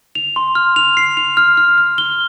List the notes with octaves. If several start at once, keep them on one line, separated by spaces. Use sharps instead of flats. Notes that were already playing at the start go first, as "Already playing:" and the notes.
F7
C6
F6
F7
C7
F7
F6
F6
F6
G7